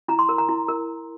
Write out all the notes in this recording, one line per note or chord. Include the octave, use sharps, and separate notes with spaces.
E4 A#5
C6
A#4
A#5
E4
A#4